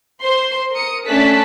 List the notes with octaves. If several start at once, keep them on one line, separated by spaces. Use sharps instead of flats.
C5 C6
A#4 D#6 C#7
A3 C#4 D4 A5 F#6 B6